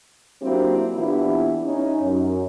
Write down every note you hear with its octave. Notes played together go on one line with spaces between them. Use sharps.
F#3 A#3 C4 D4 E4 G4
A#2 E3 B3 D4 E4 G4
C#4 D#4
F#2